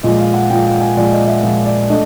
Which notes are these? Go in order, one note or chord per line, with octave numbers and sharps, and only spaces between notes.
A#2 F3 G#3 D#5
F5
F#5
A#2 F3 G#3 G5
G5
G#5
A#2 F3 G#3 D5
D#5
E5
A#2 F3 G#3
D5
A3 D4 D#5